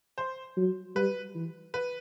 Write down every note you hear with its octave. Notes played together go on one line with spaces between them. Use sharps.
C5
F#3
G3 B4
E3
B4